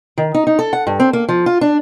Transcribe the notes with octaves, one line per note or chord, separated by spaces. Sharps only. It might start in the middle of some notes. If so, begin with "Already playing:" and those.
D#3
D#4
D#4
A4
F#5
G2
C4
A#3
F3
F4
D4